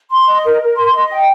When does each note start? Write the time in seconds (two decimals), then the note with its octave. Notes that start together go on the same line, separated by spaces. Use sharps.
0.11 C6
0.27 D#5
0.44 A#4
0.61 A#4
0.77 C6
0.94 D#5
1.11 G5